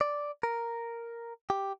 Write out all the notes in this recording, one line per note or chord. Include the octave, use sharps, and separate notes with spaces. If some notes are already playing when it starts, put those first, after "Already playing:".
D5
A#4
G4